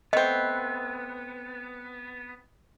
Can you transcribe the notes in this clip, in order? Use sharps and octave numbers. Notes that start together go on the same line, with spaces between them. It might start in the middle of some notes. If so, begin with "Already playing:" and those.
A3 B3 C4 D#5